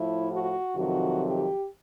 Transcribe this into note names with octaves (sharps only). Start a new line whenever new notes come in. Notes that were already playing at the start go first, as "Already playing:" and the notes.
Already playing: A2 F3 E4
F#4
F2 C3 D#3 F#3 F#4
G4